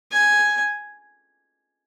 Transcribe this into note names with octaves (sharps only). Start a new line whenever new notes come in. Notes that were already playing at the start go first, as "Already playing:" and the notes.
G#5